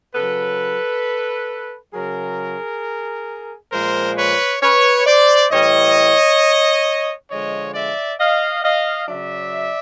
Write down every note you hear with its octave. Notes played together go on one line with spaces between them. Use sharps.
C#3 F#3 A4 B4
C#3 F#3 G#4 A#4
A#2 F3 G#3 A#4 C5
B4 C#5
B4 C#5
C5 D5
A2 E3 G3 C#5 D#5
D3 F3 G#3 C#5 D#5
D5 E5
D#5 F5
D#5 F5
C#3 F#3 D5 E5